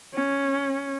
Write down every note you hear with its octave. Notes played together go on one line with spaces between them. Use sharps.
C#4